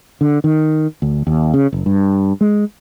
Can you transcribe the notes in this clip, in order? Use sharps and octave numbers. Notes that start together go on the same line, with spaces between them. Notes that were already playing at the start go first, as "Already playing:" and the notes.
D3
D#3
D2
D#2
C#3
F#1
G2
G#3